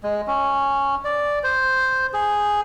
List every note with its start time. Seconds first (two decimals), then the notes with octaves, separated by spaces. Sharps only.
0.03 G#3
0.28 C#4
1.04 D5
1.43 C5
2.13 G#4